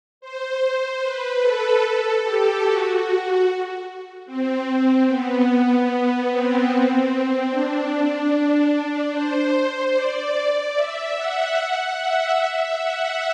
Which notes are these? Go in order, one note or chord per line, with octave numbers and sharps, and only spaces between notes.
C5
B4
A4
A4
G4
F#4
F#4
C4
C4
B3
C4
D4
C5
D5
E5
F#5
E5
F#5